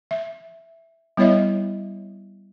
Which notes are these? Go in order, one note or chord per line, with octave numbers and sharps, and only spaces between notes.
E5
G3 B3 E4 C#5 D#5 E5